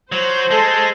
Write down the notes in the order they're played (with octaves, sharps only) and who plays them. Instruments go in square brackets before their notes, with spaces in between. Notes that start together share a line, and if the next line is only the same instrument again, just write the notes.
[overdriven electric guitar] F#3 [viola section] C5
[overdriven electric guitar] G#3 [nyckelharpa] A4 [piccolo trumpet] A5